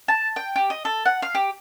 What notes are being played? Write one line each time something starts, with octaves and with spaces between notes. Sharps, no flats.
A5
G5
G4
D#5
A4
F#5
F5
G4